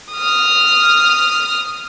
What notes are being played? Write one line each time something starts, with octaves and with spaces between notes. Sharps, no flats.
D#6 F6